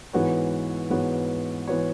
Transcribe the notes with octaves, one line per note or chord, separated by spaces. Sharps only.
G#2 E3 B3 F#4 C#5
G#2 E3 B3 F#4 C#5
E3 B3 F#4 C#5